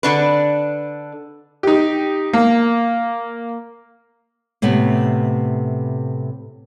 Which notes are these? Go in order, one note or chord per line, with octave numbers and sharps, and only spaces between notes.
D3 D4 B4
D#4 G4
A#3
A2 C3 A3 B3